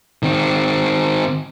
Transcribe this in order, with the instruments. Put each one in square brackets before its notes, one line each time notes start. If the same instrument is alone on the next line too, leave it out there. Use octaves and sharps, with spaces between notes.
[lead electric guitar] D#3 C4